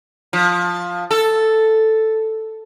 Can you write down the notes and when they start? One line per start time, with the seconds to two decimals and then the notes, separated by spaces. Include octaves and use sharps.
0.33 F3
1.11 A4